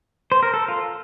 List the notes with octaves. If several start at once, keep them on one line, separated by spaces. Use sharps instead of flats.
C5
A#4
A4
F4